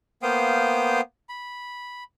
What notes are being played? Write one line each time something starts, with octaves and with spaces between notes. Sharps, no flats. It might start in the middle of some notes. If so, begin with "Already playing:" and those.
A#3 B3 C5 F5 G5 D#6
B5